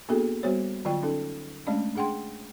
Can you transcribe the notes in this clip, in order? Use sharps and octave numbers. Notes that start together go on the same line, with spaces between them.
A#3 B3 D4 F#4 G#4 A4
G3 B3 F#4 C5 C#5
D3 F#3 F4 D5 G5
C#4 D#4 A4
G#3 A3 C#4 D4 D5 D#5
D4 G#4 F#5 G5 C6